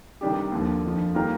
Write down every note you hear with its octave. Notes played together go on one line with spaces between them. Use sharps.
C3 D#3 G3 D4 G4
D#2 D3 F3
F2 D3 F3
D#3 G3 A#3 F4 A#4